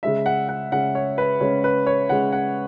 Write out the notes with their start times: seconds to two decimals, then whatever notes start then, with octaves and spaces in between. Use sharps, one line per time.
0.03 C#3 G#3 C#4 E5
0.26 F#5
0.49 F#5
0.71 C#3 G#3 C#4 F#5
0.95 C#5
1.18 B4
1.40 C#3 G#3 C#4 C#5
1.64 B4
1.86 C#5
2.09 C#3 G#3 C#4 F#5
2.32 F#5